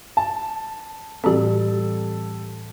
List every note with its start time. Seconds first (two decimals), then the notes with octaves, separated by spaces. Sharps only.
0.17 A5
1.24 A2 E3 G3 C4 A4